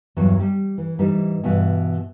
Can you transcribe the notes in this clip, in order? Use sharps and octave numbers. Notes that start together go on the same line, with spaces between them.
E2 G2 E3 F#3
G3 G4
E3
G#2 E3 G3 D#4
G2 B2 E3